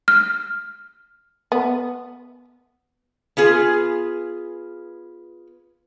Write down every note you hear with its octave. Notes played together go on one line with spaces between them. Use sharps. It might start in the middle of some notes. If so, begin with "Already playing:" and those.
F6
B3
B3 F4 G#4